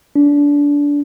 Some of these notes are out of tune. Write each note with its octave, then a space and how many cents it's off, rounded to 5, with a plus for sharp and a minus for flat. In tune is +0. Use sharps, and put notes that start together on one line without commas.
D4 -25